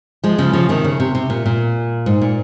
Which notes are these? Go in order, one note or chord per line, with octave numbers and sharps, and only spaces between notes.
F3 G#3
C#3 F3
C#3 F3
C3 D#3
C#3
C3
C3
A#2
A#2
G#2
A#2